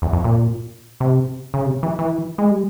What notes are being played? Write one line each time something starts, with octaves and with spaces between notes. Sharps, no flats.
E2
F2
A#2
C3
C#3
C3
E3
E3
G#3
G3